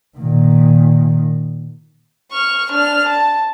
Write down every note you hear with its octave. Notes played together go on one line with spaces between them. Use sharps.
A#2 D#3
C#6 F6
D4 F6
A5